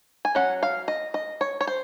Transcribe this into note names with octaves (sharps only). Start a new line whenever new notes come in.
G#5
F#3 C#4 F#5
F5
D#5
D#5
C#5
C#5
C5